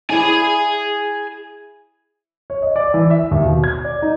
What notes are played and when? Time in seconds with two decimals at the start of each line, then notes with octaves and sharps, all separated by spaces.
0.10 E4 G#4 C5 D5 G#5
2.50 C#5
2.62 D#5
2.76 D5
2.94 E3
3.10 E5
3.31 D#2
3.44 B2
3.64 G#6
3.84 D5
4.02 D#4